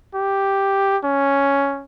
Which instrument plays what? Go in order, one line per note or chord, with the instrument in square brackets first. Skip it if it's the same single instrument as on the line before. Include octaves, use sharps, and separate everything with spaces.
[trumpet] G4
C#4